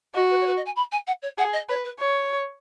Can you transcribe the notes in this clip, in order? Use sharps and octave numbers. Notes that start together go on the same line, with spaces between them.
F#4 D#5
B4
C#5
B4
D#5
G#5
B5
G#5
F#5
C#5
G#4 F#5
D#5
B4 C#5
B4
C#5